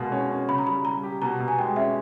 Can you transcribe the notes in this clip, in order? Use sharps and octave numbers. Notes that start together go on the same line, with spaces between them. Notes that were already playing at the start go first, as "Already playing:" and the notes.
Already playing: B2 G#3 A#3
C#4
C#4
C#3 B5
A#5
G3 B5
G3 A#5
G4
B2 A#5
B2
G#5
G#3 G5
C#4 E5